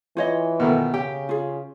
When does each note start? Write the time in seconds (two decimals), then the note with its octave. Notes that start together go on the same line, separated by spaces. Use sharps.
0.17 E3 F4 C#5 D#5
0.60 B2 D#3 A3
0.94 C#3 G4 G5
1.29 F4 G#4